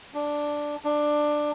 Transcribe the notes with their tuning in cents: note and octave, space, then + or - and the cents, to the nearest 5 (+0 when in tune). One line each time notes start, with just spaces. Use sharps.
D4 +0
D4 +15